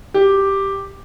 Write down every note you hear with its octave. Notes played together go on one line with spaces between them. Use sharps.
G4